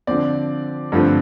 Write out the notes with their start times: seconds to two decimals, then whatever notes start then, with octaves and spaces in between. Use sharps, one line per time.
0.07 D3 F3 C4 D5
0.92 G2 D3 F3 A3 C4